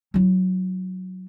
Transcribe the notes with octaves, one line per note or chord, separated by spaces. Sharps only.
F#3 E4